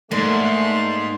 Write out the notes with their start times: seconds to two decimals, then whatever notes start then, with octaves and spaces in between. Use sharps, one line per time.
0.11 G#2 A3 A#3 D5 C6